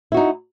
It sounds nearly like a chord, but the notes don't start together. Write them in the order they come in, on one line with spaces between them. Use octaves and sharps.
E4 F#4 D#4